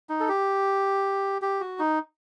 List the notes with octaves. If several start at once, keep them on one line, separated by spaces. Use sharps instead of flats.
D#4
A4
G4
G4
F#4
D#4